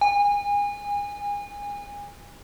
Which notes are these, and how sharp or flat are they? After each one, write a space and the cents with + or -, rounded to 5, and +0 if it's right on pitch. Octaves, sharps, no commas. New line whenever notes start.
G#5 -30